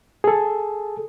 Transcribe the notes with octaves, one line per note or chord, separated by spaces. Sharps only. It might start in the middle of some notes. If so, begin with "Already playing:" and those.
G#4 A4